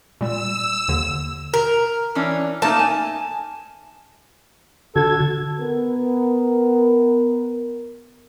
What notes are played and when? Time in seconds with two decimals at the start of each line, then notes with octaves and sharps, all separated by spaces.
0.21 A#2 G3 E6
0.88 D#2 D3
1.54 A#4
2.15 E3 C#4 D4
2.62 A3 A#3 D#4 A5
2.79 G#5
4.96 D3 F#4 A4 G#6
5.59 B3 A#4